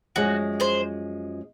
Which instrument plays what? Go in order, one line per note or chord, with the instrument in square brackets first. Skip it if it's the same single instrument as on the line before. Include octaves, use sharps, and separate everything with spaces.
[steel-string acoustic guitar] F#2 F3 G#3 [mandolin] F#4
[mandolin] G#4 C5